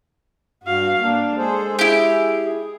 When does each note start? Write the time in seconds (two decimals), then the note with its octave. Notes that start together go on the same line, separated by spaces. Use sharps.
0.64 G2 F#4 F5
1.02 A#3 D4
1.37 G#3 G#4 A4 C5
1.79 E4 G4 G#4
2.44 G#4